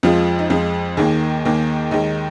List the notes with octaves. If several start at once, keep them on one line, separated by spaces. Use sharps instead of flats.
F2 F3 G#3 F4
D#4
F2 F3 G#3 F4
D#2 D#3 A#3 G#4
D#2 D#3 A#3
D#2 D#3 G#3 D#4